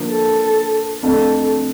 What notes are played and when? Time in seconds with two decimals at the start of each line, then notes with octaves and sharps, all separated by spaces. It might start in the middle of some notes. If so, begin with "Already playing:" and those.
Already playing: D3 F3 A#3
0.09 A4
1.02 F2 D3 A3 A4